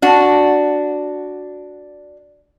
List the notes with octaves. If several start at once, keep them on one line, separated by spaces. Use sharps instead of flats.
D4 F#4